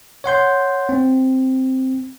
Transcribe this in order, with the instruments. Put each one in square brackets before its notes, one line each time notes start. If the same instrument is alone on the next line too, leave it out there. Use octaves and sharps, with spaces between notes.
[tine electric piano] C#5 F#5 C6 G6
C4